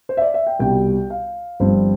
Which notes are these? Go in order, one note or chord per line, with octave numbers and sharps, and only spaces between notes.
C5
E5
D5
E5
G5
C2 B2 G3 G5
F5
G1 G2 F3 C4 C5